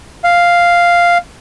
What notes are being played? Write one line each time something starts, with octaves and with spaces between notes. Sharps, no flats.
F5